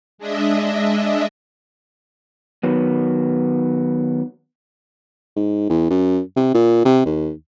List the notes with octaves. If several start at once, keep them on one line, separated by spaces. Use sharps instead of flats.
G#3 D4 D#5 E5
D#3 F#3 B3
G#2
E2
F#2
C3
A#2
C3
D#2